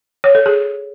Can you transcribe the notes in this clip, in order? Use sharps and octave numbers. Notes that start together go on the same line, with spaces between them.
C#5
A4
G#4